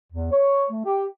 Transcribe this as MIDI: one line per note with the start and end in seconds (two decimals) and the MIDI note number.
0.12 0.31 40
0.31 0.63 73
0.69 0.82 57
0.84 1.03 67